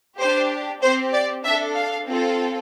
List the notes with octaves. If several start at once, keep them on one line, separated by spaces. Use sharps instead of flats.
D4 G4 C5
C4 G4 C5
D5
D4 A4 E5
F5
C4 F4 A4